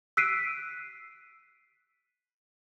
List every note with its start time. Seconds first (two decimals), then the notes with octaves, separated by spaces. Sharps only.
0.17 E6 F#6 B6 C7 D7 D#7